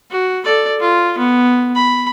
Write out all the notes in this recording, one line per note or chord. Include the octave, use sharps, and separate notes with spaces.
F#4
A4 D5
F4
B3
B5